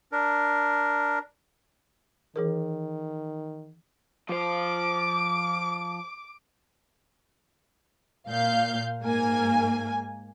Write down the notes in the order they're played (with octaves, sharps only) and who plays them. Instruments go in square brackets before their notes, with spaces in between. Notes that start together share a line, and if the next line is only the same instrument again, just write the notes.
[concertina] D4 A#4
[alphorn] D#3 [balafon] E3 G#4 A#4
[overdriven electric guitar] F3 C5 [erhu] D6
[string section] A#2 F5 G6
G#2 A#3 G#5